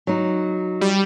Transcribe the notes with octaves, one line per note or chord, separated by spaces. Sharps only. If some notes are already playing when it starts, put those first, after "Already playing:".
F#3 D#4
G3